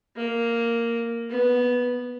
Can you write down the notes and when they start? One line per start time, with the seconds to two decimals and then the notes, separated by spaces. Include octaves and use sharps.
0.16 A#3
1.30 B3